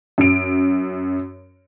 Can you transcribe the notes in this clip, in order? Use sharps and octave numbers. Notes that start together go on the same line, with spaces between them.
F#2 D7